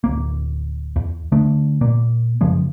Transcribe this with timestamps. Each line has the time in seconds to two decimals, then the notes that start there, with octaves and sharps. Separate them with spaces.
0.04 D1 C2 A#3
0.96 E2
1.32 D3 A3 D4
1.81 A#2 A#3
2.41 F#2 C#3 F3 G#3